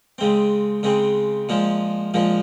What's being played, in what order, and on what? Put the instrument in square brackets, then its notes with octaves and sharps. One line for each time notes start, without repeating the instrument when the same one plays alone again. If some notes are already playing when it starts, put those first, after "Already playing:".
[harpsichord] C#3 G#3 C4
C#3 G#3 C4
A#2 F3 G#3
A#2 F3 G#3